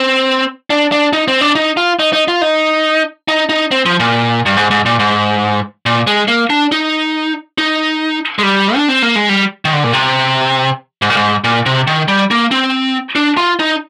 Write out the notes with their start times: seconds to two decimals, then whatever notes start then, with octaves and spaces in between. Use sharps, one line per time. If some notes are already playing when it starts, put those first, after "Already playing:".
Already playing: C4
0.70 D4
0.92 D4
1.13 D#4
1.28 C4
1.41 D4
1.55 D#4
1.77 F4
1.99 D#4
2.13 D#4
2.28 F4
2.42 D#4
3.28 D#4
3.49 D#4
3.71 C4
3.86 F3
4.00 A#2
4.46 G2
4.57 G#2
4.71 G#2
4.86 A#2
4.99 G#2
5.86 A#2
6.07 G#3
6.28 A#3
6.50 D4
6.72 D#4
7.58 D#4
8.39 G#3
8.43 G3
8.76 D4
8.89 C4
9.02 A#3
9.16 G#3
9.29 G3
9.65 D#3
9.73 D3
9.84 A#2
9.93 C3
11.02 G#2
11.10 A#2
11.17 G#2
11.44 A#2
11.66 C3
11.87 D#3
12.08 G3
12.31 A#3
12.51 C4
13.15 D4
13.37 F4
13.60 D#4